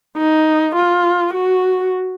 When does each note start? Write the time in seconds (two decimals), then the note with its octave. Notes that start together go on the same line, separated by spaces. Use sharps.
0.17 D#4
0.76 F4
1.34 F#4